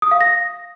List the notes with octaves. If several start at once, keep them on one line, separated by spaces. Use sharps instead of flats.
D#6
F5
A#6